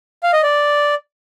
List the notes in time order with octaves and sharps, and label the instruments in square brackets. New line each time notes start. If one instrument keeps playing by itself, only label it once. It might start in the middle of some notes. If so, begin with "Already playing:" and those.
[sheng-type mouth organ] F5
D#5
D5